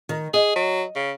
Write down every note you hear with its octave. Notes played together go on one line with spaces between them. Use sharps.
D#3
G#4 D#5
F#3
C#3